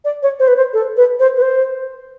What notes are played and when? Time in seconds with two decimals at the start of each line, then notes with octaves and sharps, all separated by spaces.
0.05 D5
0.23 C#5
0.39 C5
0.48 B4
0.56 C5
0.73 A4
0.97 B4
1.19 C5
1.37 B4
1.42 C5